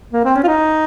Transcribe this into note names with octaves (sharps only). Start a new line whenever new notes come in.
A#3
C4
C#4
F4
D#4